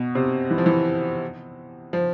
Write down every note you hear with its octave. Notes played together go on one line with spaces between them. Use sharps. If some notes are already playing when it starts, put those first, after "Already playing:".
Already playing: B2
C3
E3
F3
E3
F3